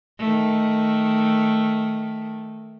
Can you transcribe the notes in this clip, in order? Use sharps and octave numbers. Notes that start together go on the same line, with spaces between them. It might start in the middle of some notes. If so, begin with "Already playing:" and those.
D#3 A3